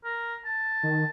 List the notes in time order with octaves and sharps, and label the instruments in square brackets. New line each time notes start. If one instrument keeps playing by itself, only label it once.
[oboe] A#4
A5
[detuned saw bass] D#3